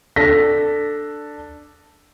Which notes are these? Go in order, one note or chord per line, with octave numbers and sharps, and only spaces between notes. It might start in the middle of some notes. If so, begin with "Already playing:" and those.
D4 A4 A#6 B6